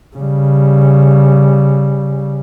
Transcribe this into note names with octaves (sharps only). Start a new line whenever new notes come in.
C#3 G3